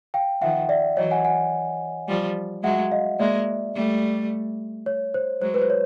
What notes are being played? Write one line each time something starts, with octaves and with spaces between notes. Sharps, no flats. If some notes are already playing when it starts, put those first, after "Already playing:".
F5 G5
D#3 F3 E5 F#5
D5 E5
E3 F#3 C#5 D#5
F#5 G#5
F#5 G#5
F3 G3
F#3 G#3 E5 F#5
D#5 F5
G#3 A#3 D5 E5
G3 A3
C#5
C5
F#3 G#3 C5
B4
C5
C#5